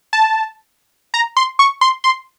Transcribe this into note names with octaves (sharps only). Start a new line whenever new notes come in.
A5
A#5
C6
C#6
C6
C6